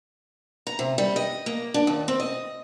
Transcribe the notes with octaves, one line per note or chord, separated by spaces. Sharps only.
A#5
C3
G3
D#5
A#3
D4
D#2
C4
D#5